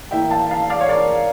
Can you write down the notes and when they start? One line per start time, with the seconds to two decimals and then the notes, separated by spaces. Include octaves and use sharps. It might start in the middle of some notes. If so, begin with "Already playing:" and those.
0.11 A2 E3 A#3 E5 G5
0.30 F5 A5
0.50 F5 A5
0.70 D5 F5
0.80 C#5
0.89 A#4 D5